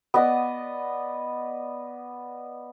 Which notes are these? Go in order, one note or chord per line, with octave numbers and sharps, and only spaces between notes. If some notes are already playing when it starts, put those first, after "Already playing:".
B3 D5 D#5